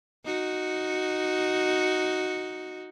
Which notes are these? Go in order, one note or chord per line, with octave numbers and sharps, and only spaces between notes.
D#4 F#4